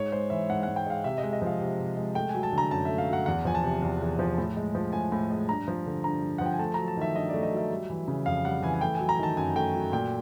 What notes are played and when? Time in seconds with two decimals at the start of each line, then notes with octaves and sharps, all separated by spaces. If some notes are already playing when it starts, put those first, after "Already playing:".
Already playing: G#2 C#5
0.12 G#3 C5
0.30 E3 E5
0.50 G#2 F#5
0.63 F#5
0.68 G#2
0.76 G5
0.86 G#3 F5
1.04 C3 E5
1.18 D#5
1.23 G#3
1.33 D#5
1.42 F3 F5
1.60 C3
1.79 C3
1.97 G#3
2.15 A3 G5
2.29 G#5
2.35 F#3
2.43 A5
2.53 D3
2.58 A#5
2.71 F#2 A5
2.85 A3 E5
2.98 F5
3.08 F#3
3.13 F#5
3.26 E2 F#5
3.45 F3 G#5
3.55 A5
3.63 C3
3.82 E2
4.01 E2
4.19 F3
4.38 A2
4.57 G#3
4.75 F3
4.93 A2 G#5
5.12 A2
5.31 G#3
5.49 G2 A#5
5.68 F3
5.86 D3
6.04 G2 A#5
6.22 G2
6.38 F#5
6.41 F3 G5
6.53 G#5
6.59 A3 A5
6.74 F#3 A#5
6.88 A5
6.97 D#3 E5
7.15 G2 D#5
7.29 A3 D5
7.43 D#5
7.52 F#3 E5
7.70 G3
7.90 E3
8.08 C#3
8.26 F2 F5
8.44 G3 F#5
8.63 E3 G#5
8.74 G#5
8.81 A3 G5
8.95 F#3 G#5
9.09 A#5
9.19 D#3 A5
9.37 F#2 G#5
9.56 A3 G5
9.74 F#3
9.92 A#2 G5